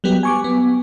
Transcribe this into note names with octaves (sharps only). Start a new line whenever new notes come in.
F#3 G3 B3 G4
G#5 C#6 D6
B3